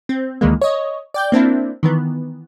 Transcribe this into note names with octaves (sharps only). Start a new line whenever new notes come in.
C4
D2 D#3 E3 G#3 A#3
C#5 D#5
D5 G5 G6
A#3 C4 D4 E4
D#3 E3 B3